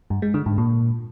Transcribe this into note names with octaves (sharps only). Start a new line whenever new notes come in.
G2
G#3
D3
G#2
A#2